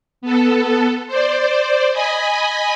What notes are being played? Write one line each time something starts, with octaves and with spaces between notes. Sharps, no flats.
B3 A4
C5 D5
D#5 G#5 B5